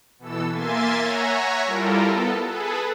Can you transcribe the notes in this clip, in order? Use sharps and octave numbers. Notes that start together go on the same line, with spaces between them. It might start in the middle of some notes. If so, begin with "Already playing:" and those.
B2 E3 A4 E6
A#3 E5 G#5 C6 A6
C#5 E5 F#5 G#5 A#5
G3 E4 F4 A4 A#4
B3 A4
G#4 A4 B4